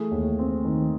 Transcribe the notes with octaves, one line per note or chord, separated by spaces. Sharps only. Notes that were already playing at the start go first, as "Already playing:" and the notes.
Already playing: E3 A3 G#4
D#2
C4
D#3